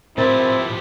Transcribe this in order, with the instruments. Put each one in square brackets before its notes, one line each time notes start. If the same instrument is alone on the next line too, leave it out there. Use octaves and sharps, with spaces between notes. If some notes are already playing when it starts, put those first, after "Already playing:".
[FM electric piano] A2 A#4 A6 [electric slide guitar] F3 G4 B4 [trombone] C4 [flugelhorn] E4